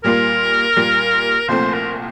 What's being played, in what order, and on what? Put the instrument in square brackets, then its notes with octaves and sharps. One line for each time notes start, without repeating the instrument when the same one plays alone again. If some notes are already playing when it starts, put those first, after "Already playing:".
[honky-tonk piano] A#2 G3 A#3 F4 [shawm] A#4
[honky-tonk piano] A#2 G3 A#3 F4
[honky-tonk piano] C2 A#2 F3 A3 C4 [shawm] C5
[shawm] A#4